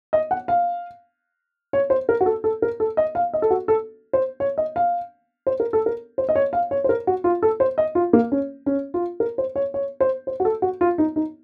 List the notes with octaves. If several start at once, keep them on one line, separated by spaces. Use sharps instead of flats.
D#5
F#5
F5
C#5
C5
A#4
F#4
A4
A4
A#4
A4
D#5
F5
D#5
A4
F#4
A4
C5
C#5
D#5
F5
C5
A#4
A4
A#4
C5
D#5
C#5
F5
C#5
C5
A#4
F#4
F4
A4
C5
D#5
F4
A#3
C#4
C#4
F4
A#4
C5
C#5
C#5
C5
C5
F#4
A4
F#4
F4
D#4
D#4